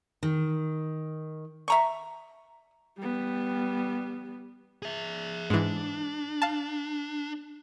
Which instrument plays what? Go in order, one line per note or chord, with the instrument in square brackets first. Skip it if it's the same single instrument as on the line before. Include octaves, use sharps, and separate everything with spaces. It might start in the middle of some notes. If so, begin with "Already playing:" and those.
[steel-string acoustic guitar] D#3
[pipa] E5 A#5 C#6
[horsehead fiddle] G3 B3
[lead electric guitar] G#4 E5
[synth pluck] G#2 E3 [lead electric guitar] D4
[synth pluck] F5 A5